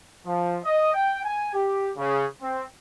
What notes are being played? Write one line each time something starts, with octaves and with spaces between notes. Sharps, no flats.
F3
D#5
G5
G#5
G4
C#3
C4